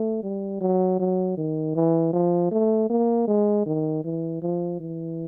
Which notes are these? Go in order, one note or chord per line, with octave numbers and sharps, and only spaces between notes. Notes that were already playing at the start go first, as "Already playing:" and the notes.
Already playing: A3
G3
F#3
F#3
D#3
E3
F3
A3
A#3
G#3
D#3
E3
F3
E3